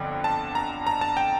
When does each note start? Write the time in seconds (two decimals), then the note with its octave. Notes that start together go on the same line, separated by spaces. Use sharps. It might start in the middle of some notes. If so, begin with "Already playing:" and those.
Already playing: G1 F2 D3 G5
0.24 A5
0.55 A#5
0.87 A#5
1.01 A5
1.17 G5